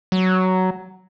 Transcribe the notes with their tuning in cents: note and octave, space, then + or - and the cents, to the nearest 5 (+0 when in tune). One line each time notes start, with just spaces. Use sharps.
F#3 +10